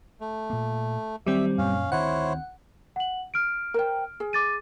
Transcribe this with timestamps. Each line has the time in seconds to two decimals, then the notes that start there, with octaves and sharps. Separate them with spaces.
0.21 A3
0.50 A#2 A#3
1.27 D#3 F#3 G3 C4 E5 E6
1.58 F#2 A#2 C#4 F5
1.92 D2 D#3 C4 E4 C5 C#5 F#5
2.96 F#5 F#7
3.34 F6 D7
3.74 A#4 C5 G5
4.20 G#4
4.33 D6 A6 D#7